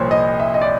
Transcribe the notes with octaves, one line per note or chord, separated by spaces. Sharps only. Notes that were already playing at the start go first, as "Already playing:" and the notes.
Already playing: C2 A#2 F3 C5 C#5
D#5
E5
D#5
D5